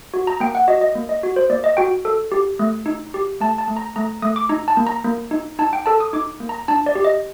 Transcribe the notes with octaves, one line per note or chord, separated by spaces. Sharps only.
F#4
A#5
A#3 G5
F#5
F#4 D#5
D#5
A#3
D#5
F#4
C5
A#3 D5
D#5
F#4 G5
A4
G4
A3
D#4
G4
A3 A5
A5
A3
A#5
A3 A#5
A3 D#6
D6
D#4 A#5
A5
A#3
A#5
A#3
D#4
D#4 A5
G5
A4 A5
D#6
D#4 D6
A#3
A#5
D4 A5
D5
G4
D#5